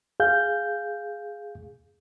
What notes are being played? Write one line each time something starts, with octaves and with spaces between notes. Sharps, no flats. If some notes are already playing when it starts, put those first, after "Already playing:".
G#4 F5 G6